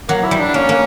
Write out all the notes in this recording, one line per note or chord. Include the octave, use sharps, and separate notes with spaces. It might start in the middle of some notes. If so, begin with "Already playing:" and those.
F#3 A#3
E4
G3
D4
A#3 C#4
A#3